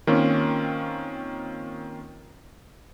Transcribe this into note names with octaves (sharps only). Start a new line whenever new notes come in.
D#3 A#3 C4 C#4 F4